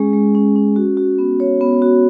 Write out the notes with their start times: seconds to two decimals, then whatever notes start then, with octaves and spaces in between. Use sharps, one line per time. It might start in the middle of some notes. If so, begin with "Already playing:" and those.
Already playing: G#3 C#4 G#4
0.13 G#3
0.35 C#4
0.56 C#4
0.76 F#4
0.97 F#4
1.18 B3
1.40 C#5
1.61 B3
1.82 F#4